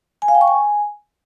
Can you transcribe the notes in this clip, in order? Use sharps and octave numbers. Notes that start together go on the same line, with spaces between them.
G#5
F5
G5
C#6
G#5